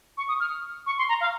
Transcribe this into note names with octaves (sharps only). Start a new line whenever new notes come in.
C#6
D#6
F6
C#6
C6
A#5
F5